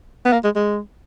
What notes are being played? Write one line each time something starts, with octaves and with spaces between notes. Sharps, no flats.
B3
A#3
G#3
G#3